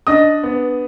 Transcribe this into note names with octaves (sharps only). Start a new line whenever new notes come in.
D4 D#5 D#6
B3